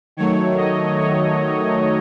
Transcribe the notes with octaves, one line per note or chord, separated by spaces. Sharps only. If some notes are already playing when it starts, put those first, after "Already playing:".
D#3 F#3 A3 C#5
D#5
C#5